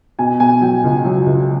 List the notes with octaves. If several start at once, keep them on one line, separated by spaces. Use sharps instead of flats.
B2 G#5
B2 G#5
F#3 G5
C#2
F#3
C#2